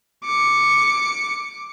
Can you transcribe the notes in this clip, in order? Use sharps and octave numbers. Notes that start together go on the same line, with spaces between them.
D6 C#7